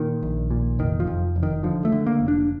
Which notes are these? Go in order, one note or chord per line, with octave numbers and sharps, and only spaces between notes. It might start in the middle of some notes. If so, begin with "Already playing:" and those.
Already playing: A#2 D#3
A#1
A#2
F1 D#3
F3
F2
F1
D#3
D3 F3
A3
D3
A#3
F1
D4